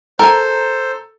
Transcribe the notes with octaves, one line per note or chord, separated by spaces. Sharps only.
A4 A#4 C5 G#5